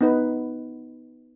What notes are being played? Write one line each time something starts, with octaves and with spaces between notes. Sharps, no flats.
B3 D#4 B4